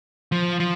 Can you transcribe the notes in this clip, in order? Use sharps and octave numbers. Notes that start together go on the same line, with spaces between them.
F3
F3